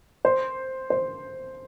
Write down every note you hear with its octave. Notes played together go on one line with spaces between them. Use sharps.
C5
C5